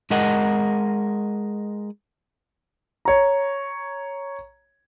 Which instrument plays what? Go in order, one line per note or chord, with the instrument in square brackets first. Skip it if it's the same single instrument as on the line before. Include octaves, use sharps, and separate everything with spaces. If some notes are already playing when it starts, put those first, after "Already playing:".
[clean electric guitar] G#3 A#4 D#5 F#5
[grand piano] C#5 A#5